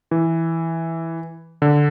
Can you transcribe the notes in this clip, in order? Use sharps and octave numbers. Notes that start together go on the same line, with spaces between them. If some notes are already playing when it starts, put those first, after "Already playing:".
E3
D3